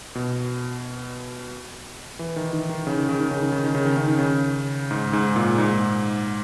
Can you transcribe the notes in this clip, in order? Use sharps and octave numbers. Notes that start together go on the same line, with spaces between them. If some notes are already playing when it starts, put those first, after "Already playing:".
B2
E3
D#3
D#3
D#3
C#3
D#3
C#3
D#3
C#3
D#3
C#3
D#3
C#3
D#3
C#3
D#3
C#3
G#2
G#2
A#2
G#2